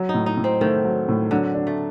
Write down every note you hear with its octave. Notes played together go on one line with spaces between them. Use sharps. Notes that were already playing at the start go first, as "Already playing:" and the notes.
Already playing: F#3
D#4
A2
D#4
A2
C4
D#3 A3
F#3
A2
D3 F#3
D4
A3